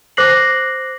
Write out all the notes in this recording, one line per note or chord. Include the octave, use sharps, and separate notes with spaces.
C5 D6 F#6 A#6 C7 F#7